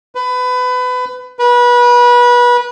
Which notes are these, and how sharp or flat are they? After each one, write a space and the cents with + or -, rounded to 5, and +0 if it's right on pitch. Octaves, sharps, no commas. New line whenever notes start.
B4 +25
B4 -25